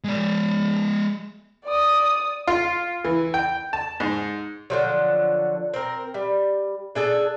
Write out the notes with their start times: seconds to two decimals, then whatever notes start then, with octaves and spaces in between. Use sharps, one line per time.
0.04 G#3 D5
1.65 D5 D#6
2.48 F4
3.04 E3
3.34 G5
3.73 A5
4.00 G#2
4.70 D3 F3 F#3
5.74 C4 A#4
6.14 G3
6.95 D4 G#4 A4 G#5